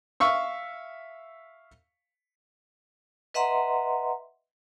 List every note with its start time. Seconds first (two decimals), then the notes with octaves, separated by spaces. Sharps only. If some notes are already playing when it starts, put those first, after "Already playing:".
0.20 E5 F5 C#6 E6
3.34 B4 D#5 E5 F#5 A#5 C6